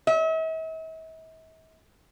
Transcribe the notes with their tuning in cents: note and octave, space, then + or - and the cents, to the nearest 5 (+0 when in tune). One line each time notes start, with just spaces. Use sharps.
E5 -45